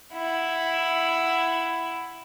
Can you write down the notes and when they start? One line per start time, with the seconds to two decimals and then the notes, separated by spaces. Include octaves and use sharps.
0.13 E4 F#5